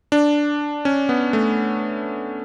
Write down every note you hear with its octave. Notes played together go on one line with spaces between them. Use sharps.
D4
C#4
B3
A3